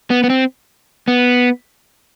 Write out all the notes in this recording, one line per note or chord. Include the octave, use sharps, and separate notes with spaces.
B3
B3
C4
B3